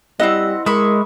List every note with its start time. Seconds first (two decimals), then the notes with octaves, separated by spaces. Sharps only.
0.20 G3 C4 E4 D#5 F#5
0.66 G#3 A#4 E5 B5 C#6